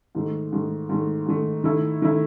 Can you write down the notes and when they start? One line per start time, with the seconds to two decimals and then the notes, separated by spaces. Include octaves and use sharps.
0.15 G#2 D#3 A3
0.52 G#2 D#3 A3
0.89 G#2 D#3 A3
1.26 G#2 D#3 A3
1.64 D#3 A3 E4 A4
2.02 D#3 A3 E4 A4